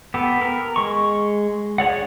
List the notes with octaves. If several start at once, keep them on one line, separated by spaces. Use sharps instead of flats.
B3 G4 A4
A#4
G#3 C#6
G#4 C#5 D5 F#5